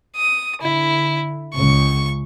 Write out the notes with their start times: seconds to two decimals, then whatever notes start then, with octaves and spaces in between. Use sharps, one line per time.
0.16 D#6
0.61 D3 E4
1.54 C#2 C#3 C#6